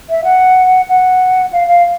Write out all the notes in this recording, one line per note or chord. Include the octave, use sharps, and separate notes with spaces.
E5
F#5
F#5
F5
F5